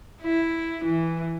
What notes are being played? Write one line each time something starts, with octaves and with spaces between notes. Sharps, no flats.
E4
E3